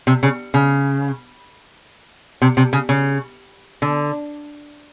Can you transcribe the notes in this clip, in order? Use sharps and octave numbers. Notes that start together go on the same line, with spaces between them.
C3
C#3
C#3
C3
C3
C#3
C#3
D3